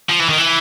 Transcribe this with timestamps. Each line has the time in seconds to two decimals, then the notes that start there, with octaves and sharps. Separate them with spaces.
0.09 F3
0.19 E3
0.29 D#3
0.38 E3